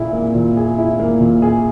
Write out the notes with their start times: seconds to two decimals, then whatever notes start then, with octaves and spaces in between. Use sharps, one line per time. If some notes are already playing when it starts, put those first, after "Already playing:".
Already playing: A#2 E4 G#4
0.13 A#3
0.35 A#2
0.57 G#4
0.78 E4
1.00 A#3
1.21 A#2
1.42 G#4